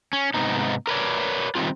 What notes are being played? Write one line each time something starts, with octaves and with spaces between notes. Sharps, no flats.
C#4
G#2 C3 B3 D#4
A#4 B4 C#5 D5
D#3 G3 C4 F4